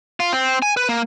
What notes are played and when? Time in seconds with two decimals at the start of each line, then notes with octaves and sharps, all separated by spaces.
0.20 F4
0.33 C4
0.62 G#5
0.77 B4
0.89 A#3